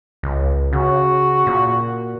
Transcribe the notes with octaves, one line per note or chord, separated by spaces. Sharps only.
C#2
C#3 F#4
A#2